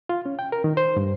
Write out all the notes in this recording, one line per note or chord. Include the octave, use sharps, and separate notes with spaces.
F4
C#4
G5
A#4
D#3
C5
G2